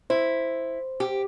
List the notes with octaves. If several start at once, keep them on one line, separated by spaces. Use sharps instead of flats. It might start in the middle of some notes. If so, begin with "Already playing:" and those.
E4 C5
G4